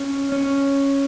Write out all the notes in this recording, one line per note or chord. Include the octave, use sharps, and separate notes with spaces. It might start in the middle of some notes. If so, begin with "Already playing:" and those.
Already playing: C#4
C#4